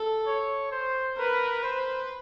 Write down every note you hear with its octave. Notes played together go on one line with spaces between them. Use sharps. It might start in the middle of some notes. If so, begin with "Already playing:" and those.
Already playing: A4
C#5
C5
A#4 B4
B4 C5